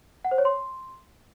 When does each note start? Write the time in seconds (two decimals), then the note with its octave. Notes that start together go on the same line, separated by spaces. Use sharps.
0.25 F#5
0.31 C5
0.38 C#5
0.45 C6